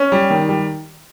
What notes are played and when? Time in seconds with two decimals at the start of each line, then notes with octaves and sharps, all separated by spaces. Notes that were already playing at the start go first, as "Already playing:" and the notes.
Already playing: C#4
0.12 G3
0.30 D#3
0.49 G3